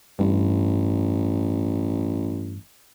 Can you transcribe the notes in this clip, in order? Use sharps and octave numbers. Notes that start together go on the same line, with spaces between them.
A1 G2